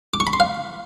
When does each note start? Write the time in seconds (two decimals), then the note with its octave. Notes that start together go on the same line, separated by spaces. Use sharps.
0.14 D6
0.20 C#6
0.27 B5
0.33 C6
0.40 F5